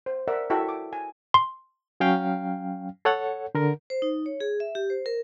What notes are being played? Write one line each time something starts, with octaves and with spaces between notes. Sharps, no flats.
C5
A#4 D5 E5 F#5
E4 F#4 A4 E5 G5 C#6
D6
G#5
C6
F#3 C#4 F5 G5 F6
A4 C#5 F#5
D3 A#4
C5
D#4
C#5
G#4
E5
G4
C5
A#4